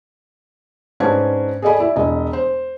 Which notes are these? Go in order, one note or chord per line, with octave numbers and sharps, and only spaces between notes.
G#2 C#4 D4 B4 A5 G#6
G#4 A4 D5 D#5 G#5 B5
E4 D5
E1 D#5
C5